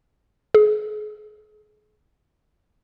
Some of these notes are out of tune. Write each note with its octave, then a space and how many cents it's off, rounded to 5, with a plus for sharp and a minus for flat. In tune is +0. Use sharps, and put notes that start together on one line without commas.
G#4 +35